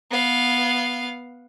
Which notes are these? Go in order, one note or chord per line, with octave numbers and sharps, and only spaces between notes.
B3 F5